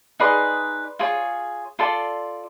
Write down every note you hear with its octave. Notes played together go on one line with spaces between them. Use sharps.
D#4 G#4 B4 D5 C6
F4 G#4 C#5
F4 A4 D5 C6